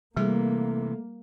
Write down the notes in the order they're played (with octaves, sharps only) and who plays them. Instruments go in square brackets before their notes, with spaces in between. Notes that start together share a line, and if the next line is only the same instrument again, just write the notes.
[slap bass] C3 E3 [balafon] G3 G#4 [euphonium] A3 [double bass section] A#3